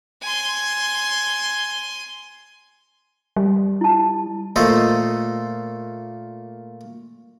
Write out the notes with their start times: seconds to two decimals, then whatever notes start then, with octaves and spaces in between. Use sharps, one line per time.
0.22 G#5 C6
3.36 G3
3.81 E4 A5
4.56 A#2 A3 A4 C5 D#5